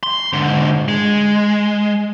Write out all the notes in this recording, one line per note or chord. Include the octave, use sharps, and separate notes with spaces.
C6
G#2 D3
G#3